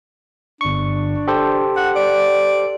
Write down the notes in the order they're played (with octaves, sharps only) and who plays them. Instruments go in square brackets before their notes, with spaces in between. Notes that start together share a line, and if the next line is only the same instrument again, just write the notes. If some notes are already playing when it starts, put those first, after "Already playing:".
[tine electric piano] G1 C#6 [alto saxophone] D4
[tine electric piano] G4 A4 C5
[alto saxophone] F#5
D5